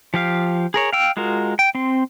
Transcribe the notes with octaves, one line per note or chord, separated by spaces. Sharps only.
F3 G4 F5
G#4 A#4 C#5
F5 G5 E6
G#3 F4 F#4 A#4
G5
C4 C6